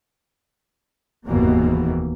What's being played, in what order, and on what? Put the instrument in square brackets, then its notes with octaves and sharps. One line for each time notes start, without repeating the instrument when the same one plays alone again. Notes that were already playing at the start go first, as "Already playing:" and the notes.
[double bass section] F1 D#2 G#2 B2 E3 A#3